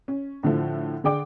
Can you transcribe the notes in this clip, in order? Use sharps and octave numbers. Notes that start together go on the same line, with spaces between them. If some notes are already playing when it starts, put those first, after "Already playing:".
C#4
A2 D3 F3 A3
D3 G#4 D5 G5 D6